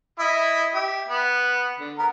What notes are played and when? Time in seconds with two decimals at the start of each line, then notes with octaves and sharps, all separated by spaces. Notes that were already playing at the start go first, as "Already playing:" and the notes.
0.19 E4 D#5 E5
0.74 G4 E5
1.08 B3
1.79 D3
1.99 B3 A#4